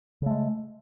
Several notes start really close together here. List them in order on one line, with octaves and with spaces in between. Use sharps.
C#3 A3 G#3